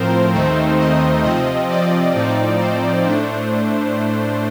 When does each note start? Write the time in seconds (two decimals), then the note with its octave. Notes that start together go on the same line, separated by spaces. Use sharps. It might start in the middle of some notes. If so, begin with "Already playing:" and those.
Already playing: A2 F3 C4 A#4 C5
0.34 D#2 D#3 A3 C4 D#4
0.80 D#5
1.24 C3 F3 C4 D#5
1.70 D5
2.14 A2 F3 C4 D#4
2.60 C5
3.05 A2 A3 D4